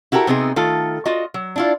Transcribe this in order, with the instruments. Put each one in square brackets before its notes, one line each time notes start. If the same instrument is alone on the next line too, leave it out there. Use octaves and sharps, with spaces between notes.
[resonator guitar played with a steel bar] E4 F#4 G4 A4 A#4
C3 B3 C4 D4 D#4 G#4
D#3 A3 F4 A4
F4 F#4 D#5
F#3
D4 E4 F4